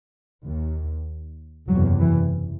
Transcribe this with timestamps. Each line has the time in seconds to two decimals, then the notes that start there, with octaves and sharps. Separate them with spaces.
0.46 D#2
1.68 F#1 E2 C3 F#3
2.00 E3